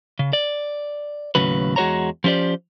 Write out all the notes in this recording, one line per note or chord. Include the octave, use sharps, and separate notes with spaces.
C#3
D5
D#2 A2 C#3 F#3 B4
E2 G#3 F#4 C5 C#5 A#5
F3 C#4 G4 C5 D5